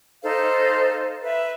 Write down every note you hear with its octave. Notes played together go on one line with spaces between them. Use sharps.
D#4 A4 C5 F5
B4 E5